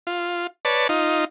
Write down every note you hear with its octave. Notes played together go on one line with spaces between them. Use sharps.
F4
B4 C#5 D5 A5
D#4 F4